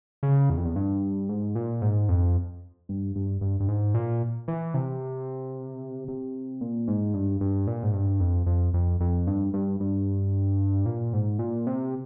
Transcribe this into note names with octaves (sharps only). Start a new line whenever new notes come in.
C#3
E2
F2
E2
G2
G#2
A#2
G#2
F2
G2
G2
G2
G2
G#2
A#2
E3
C3
C3
A#2
G#2
G2
G2
A#2
G#2
G2
F2
F2
F2
F2
G2
G2
G2
A#2
G#2
A#2
C3